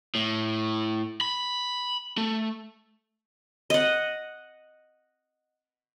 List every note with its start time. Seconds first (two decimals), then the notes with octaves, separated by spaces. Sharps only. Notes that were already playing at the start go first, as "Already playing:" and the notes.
0.15 A2
1.21 B5
2.17 A3
3.70 D#5 F#5